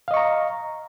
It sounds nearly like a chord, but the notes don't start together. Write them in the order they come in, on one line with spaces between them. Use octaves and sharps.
F5 D#5 C#6 A#5